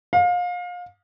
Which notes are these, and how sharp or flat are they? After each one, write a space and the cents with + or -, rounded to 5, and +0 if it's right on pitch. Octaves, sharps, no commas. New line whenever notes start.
F5 +30